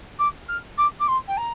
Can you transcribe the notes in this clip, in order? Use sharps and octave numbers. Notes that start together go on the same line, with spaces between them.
D6
F6
D6
D6
C6
G5
A#5